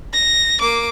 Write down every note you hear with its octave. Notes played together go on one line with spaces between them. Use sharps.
A#6
A#3 D6